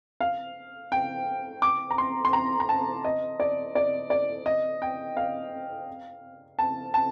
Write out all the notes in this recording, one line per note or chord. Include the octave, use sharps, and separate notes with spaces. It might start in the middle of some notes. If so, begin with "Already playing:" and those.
F5
G5
D6
A#5
C6
C6
A#5
A#5
A5
D#5
D5
D5
D5
D#5
G5
F5
A5
A5